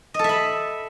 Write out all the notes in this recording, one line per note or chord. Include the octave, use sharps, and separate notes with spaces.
A4 D#5 E5 B5